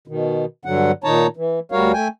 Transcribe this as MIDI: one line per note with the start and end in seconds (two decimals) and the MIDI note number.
0.07 0.45 47
0.07 0.45 51
0.65 0.91 43
0.65 0.91 50
0.65 0.91 54
0.65 0.91 78
1.04 1.27 46
1.04 1.27 51
1.04 1.27 63
1.04 1.27 73
1.04 1.27 81
1.04 1.27 82
1.37 1.59 52
1.72 1.92 38
1.72 1.92 55
1.72 1.92 66
1.72 1.92 70
1.72 1.92 73
1.72 1.92 77
1.93 2.08 57
1.93 2.08 79
1.93 2.08 80